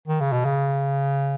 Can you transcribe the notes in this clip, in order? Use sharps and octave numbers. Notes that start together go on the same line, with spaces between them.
D#3
C#3
B2
C#3